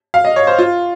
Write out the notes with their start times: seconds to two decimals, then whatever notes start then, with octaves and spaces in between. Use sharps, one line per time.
0.14 F5
0.25 D#5
0.36 C#5
0.47 C5
0.59 F4